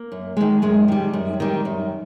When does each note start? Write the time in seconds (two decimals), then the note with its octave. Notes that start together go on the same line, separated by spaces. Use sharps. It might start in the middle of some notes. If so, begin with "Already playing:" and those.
Already playing: A#3
0.12 F#2
0.37 D#3 G#3
0.62 F#2 G#3
0.88 D#3 G3
1.13 F#2
1.40 D#3 G3
1.65 F#2